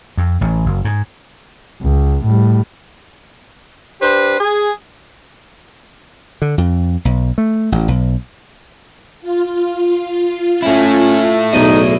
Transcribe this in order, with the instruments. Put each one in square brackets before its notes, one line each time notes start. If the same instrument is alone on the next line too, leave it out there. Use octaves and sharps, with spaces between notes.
[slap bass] F2
A1
F#1
G#2
[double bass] C#2
A2 G3
[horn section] D4 G4 B4 C5
G#4
[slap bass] D3
F2
B1
A3
A1
B1
[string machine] F4
[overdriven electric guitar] A3 E4 [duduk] C#4
[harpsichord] B1 E2 D#5 [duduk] D#4